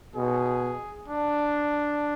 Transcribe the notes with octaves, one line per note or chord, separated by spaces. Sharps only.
B2 G#4
D4